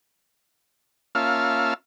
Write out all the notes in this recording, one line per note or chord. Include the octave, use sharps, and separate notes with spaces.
A#3 C#4 F4 E5 F5 A5